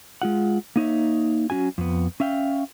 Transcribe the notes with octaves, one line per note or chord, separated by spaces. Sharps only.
G#3 F4 F#5
A#3 D#4 C#5 E5
F#3 C#4 F#4 G#5
F2 B3
C#4 E5 F5 G5